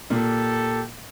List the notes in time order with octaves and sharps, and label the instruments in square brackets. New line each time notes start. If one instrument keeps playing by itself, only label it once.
[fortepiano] A#2 [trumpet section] G4 A4